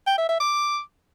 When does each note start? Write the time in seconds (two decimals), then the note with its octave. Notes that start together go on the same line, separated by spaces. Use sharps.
0.07 G5
0.18 E5
0.29 E5
0.40 D6